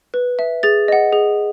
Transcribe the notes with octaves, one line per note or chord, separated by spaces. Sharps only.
B4
E5
G#4 A6
D#5 F#5
G#4